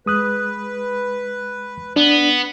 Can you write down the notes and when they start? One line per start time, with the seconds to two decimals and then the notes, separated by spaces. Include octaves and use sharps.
0.06 G#3 B4 D#6 F#6
1.96 B3 D4